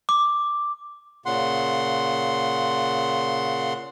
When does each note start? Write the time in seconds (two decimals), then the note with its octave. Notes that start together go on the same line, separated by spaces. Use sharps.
0.09 D6
1.26 A#2 C#3 F#5 C6